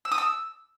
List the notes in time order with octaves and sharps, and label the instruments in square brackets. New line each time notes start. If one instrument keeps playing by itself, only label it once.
[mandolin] E6
D#6
E6